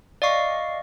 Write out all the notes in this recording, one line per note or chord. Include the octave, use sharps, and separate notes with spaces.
D5 D#5 F5 C#6 C7